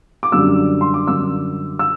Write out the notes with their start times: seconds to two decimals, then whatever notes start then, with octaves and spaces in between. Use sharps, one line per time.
0.23 D6
0.32 F#2 D3 G3 E6
0.81 C6
0.94 D6
1.07 F#2 D3 G3 E6
1.79 E6